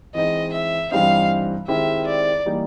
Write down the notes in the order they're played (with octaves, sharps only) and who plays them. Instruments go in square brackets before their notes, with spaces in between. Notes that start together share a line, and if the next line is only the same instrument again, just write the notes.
[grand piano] E3 G#3 C4 D#4 [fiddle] D#5
[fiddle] E5
[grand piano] G2 E3 G3 C4 D#4 [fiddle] F5
[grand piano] D#3 G#3 C4 E4 G4 [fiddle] E5
[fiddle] D5
[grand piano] E3 G3 A#3 D#4